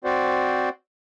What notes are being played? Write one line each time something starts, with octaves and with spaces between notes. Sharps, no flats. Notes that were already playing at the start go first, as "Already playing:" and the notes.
C4 F#4 C5 D5